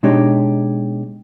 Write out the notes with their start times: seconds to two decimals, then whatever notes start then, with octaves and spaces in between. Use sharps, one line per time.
0.03 B2 G#3 D4 D#4 G4 C#5